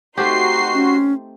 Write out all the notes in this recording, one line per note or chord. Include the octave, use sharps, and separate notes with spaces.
A3 C4 D#4 F#4 G4 C6 C7
C#4